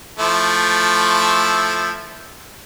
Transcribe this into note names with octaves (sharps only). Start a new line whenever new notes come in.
F3 A3 E4